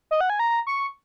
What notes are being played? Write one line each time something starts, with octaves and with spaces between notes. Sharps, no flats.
D#5
F#5
G#5
A#5
C#6